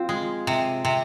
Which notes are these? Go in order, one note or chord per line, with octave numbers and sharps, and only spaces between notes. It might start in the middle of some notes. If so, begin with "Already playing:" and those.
Already playing: C4 F4
G#3
C3
C3